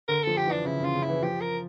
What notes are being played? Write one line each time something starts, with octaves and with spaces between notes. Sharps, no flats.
D3 A#4
F3 A4
G4
E3
D4
C#3 E4
C#3
F4
C#3
E4
E3
F3 G4
A#4